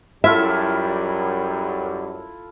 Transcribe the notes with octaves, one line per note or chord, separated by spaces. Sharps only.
F#2 G3 E4 F4 A4 E5